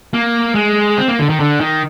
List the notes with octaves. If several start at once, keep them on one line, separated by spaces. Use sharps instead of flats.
A#3
G#3
C4
A#3
D3
D#3
D3
D#3